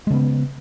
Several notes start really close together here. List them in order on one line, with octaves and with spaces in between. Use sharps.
G#3 C#3 B3